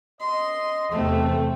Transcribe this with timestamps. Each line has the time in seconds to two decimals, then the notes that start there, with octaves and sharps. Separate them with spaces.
0.20 D#5 C6
0.91 E2 C3 A3 C4 E4 A4 E5